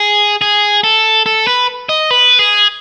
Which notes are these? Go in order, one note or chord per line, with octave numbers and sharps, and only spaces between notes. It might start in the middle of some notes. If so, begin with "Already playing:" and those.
Already playing: G#4
G#4
A4
A4
B4
D#5
B4
G#4